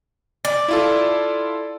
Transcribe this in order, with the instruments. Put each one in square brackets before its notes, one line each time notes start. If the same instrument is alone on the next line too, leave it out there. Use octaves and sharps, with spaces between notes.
[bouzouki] D5
[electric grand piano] E4 F4 A4